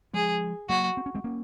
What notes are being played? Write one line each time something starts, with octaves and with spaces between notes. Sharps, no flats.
F3 G#3 G#4
F#3 A#3 F#4
C4
C#4
G#3 C4
A#3 C#4